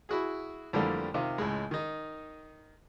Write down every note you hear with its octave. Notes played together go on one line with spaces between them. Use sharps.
E4 F#4 G#4
F2 D3 E3 G3 A3 A#3
C3 D#3 F4
C#2 A2 G#3
D#3 D#4